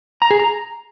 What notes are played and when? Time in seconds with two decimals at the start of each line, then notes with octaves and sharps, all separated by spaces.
0.22 A#5
0.31 G#4
0.39 A#5